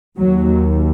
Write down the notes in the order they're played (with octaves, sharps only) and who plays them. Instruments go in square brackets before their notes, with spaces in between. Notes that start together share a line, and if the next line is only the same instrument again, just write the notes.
[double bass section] D#2 F#3